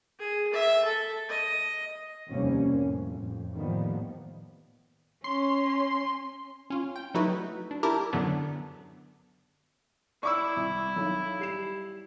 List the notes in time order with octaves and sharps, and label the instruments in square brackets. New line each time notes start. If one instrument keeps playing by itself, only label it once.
[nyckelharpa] G#4
E5
A4
D#5
[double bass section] F1 D#2 C3 G3 A#3 C#4
F2 A2
F2
A2 D#3 F3 G3 A#3 B3
[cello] C#4 [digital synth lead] C6
[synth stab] C#4 F4
G5
F#3 A3 D#4 E4 F#4 B4
D4
E4 G4 A#4 A5 A#5 D6
F#2 D3 F#3 B3 D4
[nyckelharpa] E4 [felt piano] D5 [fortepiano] C#6 D6 E6
[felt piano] C2
B1
G3 C7 E7